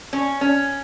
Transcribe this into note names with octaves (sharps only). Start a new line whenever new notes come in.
C#4
C#4